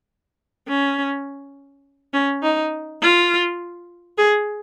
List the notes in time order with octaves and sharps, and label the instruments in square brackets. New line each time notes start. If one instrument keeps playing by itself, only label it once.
[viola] C#4
C#4
D#4
F4
G#4